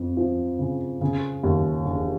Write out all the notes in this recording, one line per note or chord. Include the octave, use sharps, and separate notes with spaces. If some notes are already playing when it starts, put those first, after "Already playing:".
Already playing: F2
F3
C#3
C#3
D#2
E1